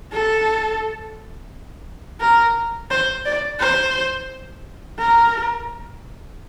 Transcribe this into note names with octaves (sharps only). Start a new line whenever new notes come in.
A4
A#4
C5
D5
C5
A#4